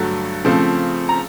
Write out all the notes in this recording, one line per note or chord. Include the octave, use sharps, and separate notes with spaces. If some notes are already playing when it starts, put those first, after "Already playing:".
Already playing: G2 D3 F#3 A3
C#3 F3 A3 C4
A#5